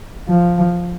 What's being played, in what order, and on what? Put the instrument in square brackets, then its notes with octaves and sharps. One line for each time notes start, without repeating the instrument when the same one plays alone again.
[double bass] F3